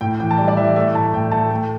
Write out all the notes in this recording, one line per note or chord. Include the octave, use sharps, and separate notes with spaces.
A2 G5
E3 G5
A5
G3 G5
D5
E3 E5
A3 E5
A2 A5
A2 G5
A3 A5
A3 G5